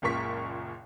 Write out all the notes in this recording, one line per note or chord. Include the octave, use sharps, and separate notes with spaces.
F#1 C#2 A#2 A#4 C#6 B6